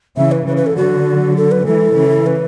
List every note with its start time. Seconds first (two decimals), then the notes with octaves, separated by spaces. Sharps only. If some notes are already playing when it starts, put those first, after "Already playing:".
0.16 C#3 E3 E5
0.32 B4
0.46 C#3 E3 B4
0.57 B4
0.66 A4
0.76 D3 F#3 F#4
1.37 A4
1.52 B4
1.66 E3 G#3 A4
1.96 C#3 E3
2.26 B4